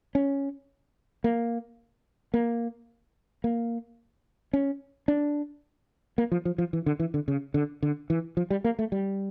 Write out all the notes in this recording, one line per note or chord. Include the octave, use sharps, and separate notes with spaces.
C#4
A#3
A#3
A#3
C#4
D4
A#3
F3
F3
F3
E3
D3
E3
D3
C#3
D3
D3
E3
F3
G3
A#3
A3
G3